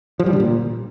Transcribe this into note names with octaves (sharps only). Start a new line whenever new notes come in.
F3
G3
D3
A#2